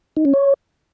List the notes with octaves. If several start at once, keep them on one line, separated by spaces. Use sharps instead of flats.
D#4
C#4
C#5